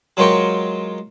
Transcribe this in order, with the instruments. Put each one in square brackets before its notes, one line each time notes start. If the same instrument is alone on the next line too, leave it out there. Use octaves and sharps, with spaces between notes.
[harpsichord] F#3 G#3 F4 A#4 G5 C#6